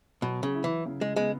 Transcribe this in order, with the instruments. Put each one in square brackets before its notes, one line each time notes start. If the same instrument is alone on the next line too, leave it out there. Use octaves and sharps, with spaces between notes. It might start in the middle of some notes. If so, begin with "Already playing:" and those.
[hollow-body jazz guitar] B2 [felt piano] F#3
[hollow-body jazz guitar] C#3
[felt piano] E4
[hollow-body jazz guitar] E3
[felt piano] C#3
[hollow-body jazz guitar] G#3
[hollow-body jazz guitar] G#3 [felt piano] B3